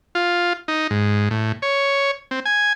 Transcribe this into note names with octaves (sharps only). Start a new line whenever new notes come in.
F4
D#4
G#2
A2
C#5
C4
G#5